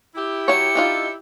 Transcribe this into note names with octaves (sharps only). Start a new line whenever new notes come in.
E4 G4
F#3 C#5 C#7
D4 D#4 F4